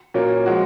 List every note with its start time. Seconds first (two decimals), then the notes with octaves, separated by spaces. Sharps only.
0.14 A#2 F#3 A#3 C#4
0.46 F3 G#3 F#4